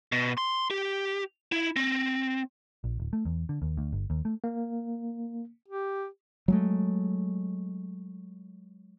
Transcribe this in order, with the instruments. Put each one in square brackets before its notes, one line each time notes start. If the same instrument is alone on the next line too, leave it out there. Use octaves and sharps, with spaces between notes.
[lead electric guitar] B2
C6
G4
E4
C4
[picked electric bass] A#1
D1
A3
E2
D3
D#2
D2
G1
D#2
A3
[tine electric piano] A#3
[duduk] G4
[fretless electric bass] F#3 G#3 A3